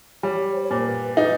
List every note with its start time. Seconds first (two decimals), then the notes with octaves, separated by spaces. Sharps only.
0.23 G3 C#5
0.55 C5
0.63 C#5
0.70 A#2 C5
0.81 A#4
0.86 B4
1.17 D#4 B4